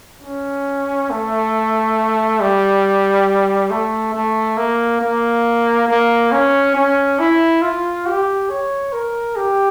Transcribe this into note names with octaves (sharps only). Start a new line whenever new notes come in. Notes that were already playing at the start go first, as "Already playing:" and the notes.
C#4
A3
G3
A3
A3
A#3
A#3
A#3
C#4
C#4
E4
F4
G4
C#5
A#4
G4